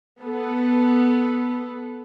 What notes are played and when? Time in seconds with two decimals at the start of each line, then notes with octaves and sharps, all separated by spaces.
0.21 B3 A4